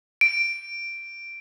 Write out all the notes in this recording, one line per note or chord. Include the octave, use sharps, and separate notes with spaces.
D7